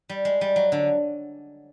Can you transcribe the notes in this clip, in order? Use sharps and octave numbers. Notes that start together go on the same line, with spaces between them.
G3
G#3
G3
F#3
D3